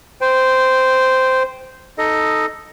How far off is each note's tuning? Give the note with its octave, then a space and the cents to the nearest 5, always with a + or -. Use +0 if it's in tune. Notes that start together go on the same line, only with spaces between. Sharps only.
C5 -10 G5 +0
D#4 +0 A4 +0 D#5 +0